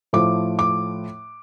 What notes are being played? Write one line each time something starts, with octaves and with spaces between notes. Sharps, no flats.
A2 F3 A3 D6
D6